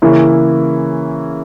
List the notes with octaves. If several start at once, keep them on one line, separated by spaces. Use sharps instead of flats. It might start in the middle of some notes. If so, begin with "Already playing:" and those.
C#3 E3 A#3 C#4 E4